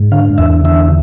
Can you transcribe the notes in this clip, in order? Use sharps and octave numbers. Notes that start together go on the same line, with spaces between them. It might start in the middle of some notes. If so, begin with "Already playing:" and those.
Already playing: G#2
D3 F5
E2 E5
D3 E5